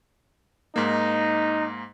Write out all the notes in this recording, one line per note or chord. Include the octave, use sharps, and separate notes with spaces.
G#2 A#3 D#4